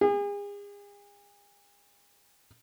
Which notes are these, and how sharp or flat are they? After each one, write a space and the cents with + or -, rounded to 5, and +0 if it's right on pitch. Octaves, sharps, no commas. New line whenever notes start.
G#4 -40